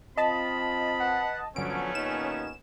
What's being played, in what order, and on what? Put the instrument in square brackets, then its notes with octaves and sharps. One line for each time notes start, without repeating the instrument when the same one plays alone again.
[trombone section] C4 F4 [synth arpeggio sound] D#5 A5 [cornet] B5
[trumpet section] B4 F#5
[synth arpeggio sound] G1 D7 [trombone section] D3 F3 F#3 [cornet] A3 [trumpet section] B3 C#4
[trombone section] D#2 A#2 D#4 [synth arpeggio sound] E7